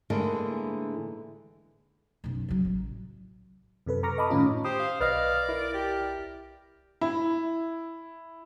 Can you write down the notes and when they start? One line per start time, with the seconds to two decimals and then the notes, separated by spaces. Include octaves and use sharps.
0.10 A2 D3 E3 G#3 A#3
2.24 F#1 B1
2.48 C#3 F#3
2.65 A1
3.86 F#2 C3 A4 B4
4.03 A#5 C#6 D6 F6 A#6
4.18 D#5 A5 B5 D6 D#6
4.30 A2 D#3 C#4 F4
4.65 G4 C5 D#6
4.79 F5
5.00 B1 B4 D5 D#5 F5 F6 A#6
5.49 E4 A#4
5.74 G4
7.01 E4